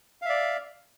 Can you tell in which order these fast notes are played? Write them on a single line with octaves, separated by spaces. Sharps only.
F5 E5 D5